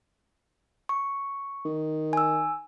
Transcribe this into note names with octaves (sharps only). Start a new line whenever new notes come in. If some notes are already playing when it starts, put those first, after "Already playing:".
C#6
D#3
G#5 E6